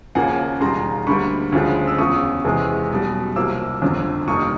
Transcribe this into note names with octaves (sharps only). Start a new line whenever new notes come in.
D#2 C#3 F3 A#3 F#5 G#5
E1 D#2 D#3 G3 A#5 C6
D2 D3 G3 A#3 B5 C#6
D2 C#3 F3 G#3
E6
E2 C#3 F3 C#6 D#6
E2 C3 E3 G#3 B3
B1 B2 G3
C2 C3 F3 A#3 D6 E6
G1 F2 D3 F3
F1 D#2 D#3 G3 A#3 C#6 D#6